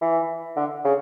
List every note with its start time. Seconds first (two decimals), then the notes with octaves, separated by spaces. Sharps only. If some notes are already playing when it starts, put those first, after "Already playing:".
0.01 E3
0.56 D3
0.85 C#3